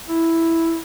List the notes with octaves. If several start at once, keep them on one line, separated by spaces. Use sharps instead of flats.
E4